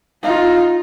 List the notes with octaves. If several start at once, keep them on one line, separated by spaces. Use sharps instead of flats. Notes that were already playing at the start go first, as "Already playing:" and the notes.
D#4 F4